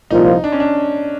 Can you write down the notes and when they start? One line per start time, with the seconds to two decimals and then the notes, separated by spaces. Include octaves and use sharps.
0.10 C2 A#2 F3 D#4
0.44 D4
0.52 C#4
0.60 D4